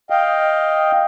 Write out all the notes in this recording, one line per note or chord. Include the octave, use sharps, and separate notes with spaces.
D#5 F5 G5